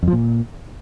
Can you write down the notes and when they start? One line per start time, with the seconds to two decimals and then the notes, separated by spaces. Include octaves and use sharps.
0.03 F2
0.08 F3
0.13 A#2